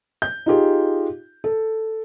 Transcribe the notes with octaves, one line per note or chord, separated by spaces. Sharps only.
G6
D#4 F4 G4 G#4
A4